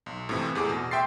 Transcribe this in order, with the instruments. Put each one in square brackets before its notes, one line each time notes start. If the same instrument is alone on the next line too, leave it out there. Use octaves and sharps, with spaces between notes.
[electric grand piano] B1
A2 C3 E3
E2 A3 G#4 D6
B2
E5 G5 C6 A6 C7